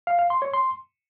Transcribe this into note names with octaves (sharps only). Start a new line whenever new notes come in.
F5
F5
C6
C#5
C6